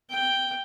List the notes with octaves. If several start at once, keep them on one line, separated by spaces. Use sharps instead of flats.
G5